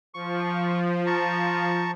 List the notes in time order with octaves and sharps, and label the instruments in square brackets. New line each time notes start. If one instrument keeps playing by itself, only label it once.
[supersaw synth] F3 [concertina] C#6
[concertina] A5 A#5 C#6